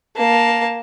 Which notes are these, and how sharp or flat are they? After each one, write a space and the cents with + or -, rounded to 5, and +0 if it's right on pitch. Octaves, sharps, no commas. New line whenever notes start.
A#3 +5 A5 -5